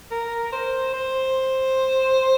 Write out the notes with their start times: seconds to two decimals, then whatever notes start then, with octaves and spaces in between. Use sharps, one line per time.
0.11 A#4
0.52 C5
0.94 C5